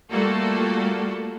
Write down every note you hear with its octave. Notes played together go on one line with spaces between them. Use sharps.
G3 A3 A#3 F4 F#4 A4